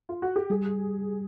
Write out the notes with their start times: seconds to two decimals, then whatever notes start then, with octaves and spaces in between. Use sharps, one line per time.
0.09 F4
0.22 F#4
0.36 G4
0.50 G3 G#4